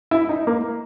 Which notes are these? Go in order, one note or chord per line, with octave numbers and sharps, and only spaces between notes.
E4
D#4
A#3